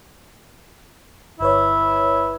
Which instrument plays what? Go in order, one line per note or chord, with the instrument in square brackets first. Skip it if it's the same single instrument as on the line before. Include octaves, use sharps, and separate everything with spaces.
[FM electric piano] G1 B4 C#5 [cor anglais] E4